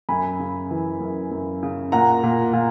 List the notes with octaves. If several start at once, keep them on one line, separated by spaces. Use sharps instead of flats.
F#2 G#5 B5
C#3
E3
F#2
F#2
C#3
A#2 F#5 A#5
A#2
A#2